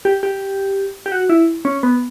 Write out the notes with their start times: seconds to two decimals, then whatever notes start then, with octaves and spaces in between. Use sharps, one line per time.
0.05 G4
0.23 G4
1.06 G4
1.12 F#4
1.29 E4
1.65 C#4
1.83 B3